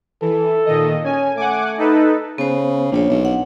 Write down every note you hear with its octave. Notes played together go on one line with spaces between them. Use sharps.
E3 A4
A#2 D#3 D#5
C#4 G#5
A3 F#5 G#5 D6
D#4 A4 B4
C#3 B3 C5
A#1 D4 C#5
B1
F#5